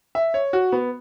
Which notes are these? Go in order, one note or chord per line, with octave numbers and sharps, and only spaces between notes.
E5
C#5
F#4
B3